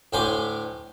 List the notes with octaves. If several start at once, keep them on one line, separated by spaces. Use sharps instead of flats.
D2 A2 G5 G#5 C6 D6